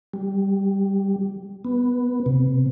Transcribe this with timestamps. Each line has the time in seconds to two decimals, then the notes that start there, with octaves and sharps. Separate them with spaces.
0.14 G3
1.65 B3
2.26 C3